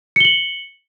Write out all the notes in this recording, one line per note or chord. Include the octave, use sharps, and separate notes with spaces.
C#7 F#7 G7